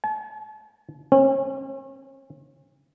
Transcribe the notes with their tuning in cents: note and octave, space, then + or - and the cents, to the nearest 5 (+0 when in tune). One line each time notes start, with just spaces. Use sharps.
A5 -45
C#4 -40